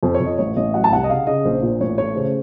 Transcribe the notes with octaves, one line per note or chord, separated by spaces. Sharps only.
F2 C5
C#5
F2
D#5
A1 C#5
A1 D#5
F#3 F#5
A5
C2 F#5
D#5
C#3 F5
C#3 D#5
A#1 C5
A#2
A1 C#5
A3 C#5
C#3 C5